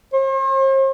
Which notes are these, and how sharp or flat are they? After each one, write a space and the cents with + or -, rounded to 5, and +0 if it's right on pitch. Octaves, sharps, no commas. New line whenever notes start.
C5 +45